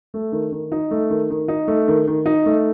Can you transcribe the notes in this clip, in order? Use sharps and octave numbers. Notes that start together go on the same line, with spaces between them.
A3
D#3
D#3
D#4
A3
D#3
D#3
D#4
A3
D#3
D#3
D#4
A3